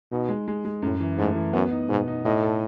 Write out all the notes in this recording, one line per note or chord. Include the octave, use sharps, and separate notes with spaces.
B2 D#4
G#3
G#3
G#3
F#2 A2
E3
G#2 A3
E3
F#2 B3
D#4
G#2 B2
D#4
A2 D#5
A4